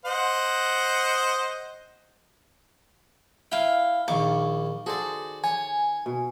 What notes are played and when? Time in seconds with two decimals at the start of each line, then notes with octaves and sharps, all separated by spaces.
0.05 C5 D#5 F#5
3.52 E4 F5 G5
4.08 A#1 D#2 D#3 A#3 C#6 D6
4.86 F#4 G#4 A4 C5 D5
5.44 C#5 G#5
6.06 B2